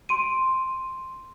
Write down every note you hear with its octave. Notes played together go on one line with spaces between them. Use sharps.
C6 D7 D#7